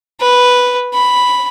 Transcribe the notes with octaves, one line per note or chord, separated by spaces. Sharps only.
B4
B5